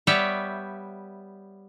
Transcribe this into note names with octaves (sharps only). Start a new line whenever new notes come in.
G3 B3 G4 C#5 E5